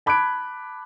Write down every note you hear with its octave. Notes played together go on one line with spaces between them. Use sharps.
A5 B5 D6 F#6 G#6 D7